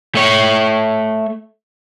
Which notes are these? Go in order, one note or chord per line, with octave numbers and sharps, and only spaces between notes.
A3 C#5